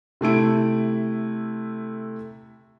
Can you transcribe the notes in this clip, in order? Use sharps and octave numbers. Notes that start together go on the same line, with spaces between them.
C3 A3 E4 D7